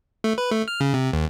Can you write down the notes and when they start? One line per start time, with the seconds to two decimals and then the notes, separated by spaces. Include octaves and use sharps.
0.24 A3
0.38 B4
0.52 A3
0.68 F6
0.80 C#3
0.94 C3
1.13 D#2